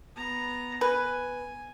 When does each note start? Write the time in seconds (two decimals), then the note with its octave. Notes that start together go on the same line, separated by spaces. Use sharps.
0.16 B3 A#5
0.81 B4 G#5